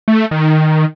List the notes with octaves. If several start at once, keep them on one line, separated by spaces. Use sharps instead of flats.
A3
D#3